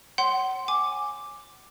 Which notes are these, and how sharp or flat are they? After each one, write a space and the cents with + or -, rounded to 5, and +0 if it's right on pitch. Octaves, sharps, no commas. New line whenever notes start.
C#5 -30 F#5 +30 C6 +0
G#5 +0 D6 +0